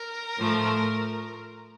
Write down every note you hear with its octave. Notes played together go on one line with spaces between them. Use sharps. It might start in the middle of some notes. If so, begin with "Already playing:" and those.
Already playing: A#4
A2 F3 A3